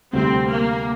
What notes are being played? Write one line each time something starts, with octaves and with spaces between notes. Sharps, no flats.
D2 C3 G3 C4
A#3